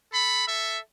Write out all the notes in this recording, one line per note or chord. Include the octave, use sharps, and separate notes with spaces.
A4 B5
A4 E5